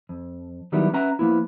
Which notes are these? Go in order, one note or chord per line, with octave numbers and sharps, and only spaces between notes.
F2
D#3 F#3 G3 B3 D#4 E4
C#4 B4 E5 F#5 A#5
F3 A#3 B3 E4